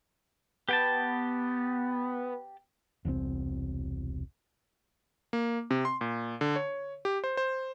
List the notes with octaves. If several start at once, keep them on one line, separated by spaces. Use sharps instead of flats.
B3 G4 G5 A5
E1 C2 B2 C4
A#3
C3
C6
A#2
D3
C#5
G4
C5
C5